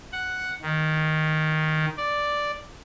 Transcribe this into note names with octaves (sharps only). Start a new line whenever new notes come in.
F#5
D#3
D5